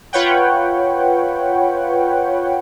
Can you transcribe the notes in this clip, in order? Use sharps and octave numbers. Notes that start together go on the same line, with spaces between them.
F4 B4 C#5 F#5 G5